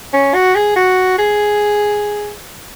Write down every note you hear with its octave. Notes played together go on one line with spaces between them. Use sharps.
C#4
F#4
G#4
F#4
G#4